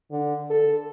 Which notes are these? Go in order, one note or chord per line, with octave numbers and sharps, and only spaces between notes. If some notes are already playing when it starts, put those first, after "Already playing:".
D3
A4